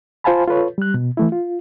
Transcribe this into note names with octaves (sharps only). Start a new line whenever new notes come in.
F4 C5 F5 G#5 A5 B5
F4 A4 B4 C#5
G3 F#6
B2
E3 A3 E4
F4